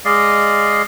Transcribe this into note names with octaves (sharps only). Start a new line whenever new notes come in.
G#3 D5 D#5 F5